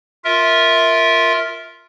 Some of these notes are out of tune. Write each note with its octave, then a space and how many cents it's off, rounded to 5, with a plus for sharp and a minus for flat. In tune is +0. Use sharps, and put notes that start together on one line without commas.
F4 +0 A#4 +0 E5 -15